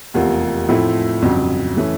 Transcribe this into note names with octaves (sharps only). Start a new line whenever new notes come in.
F1 E2 C3 F3 A#3
A2 F3 A3 C4 E4
G1 F2 C#3 F#3
E3 A3 C#4